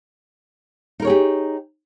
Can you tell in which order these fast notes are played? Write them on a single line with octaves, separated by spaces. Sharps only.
D#4 A#4 C#5 G#4 G4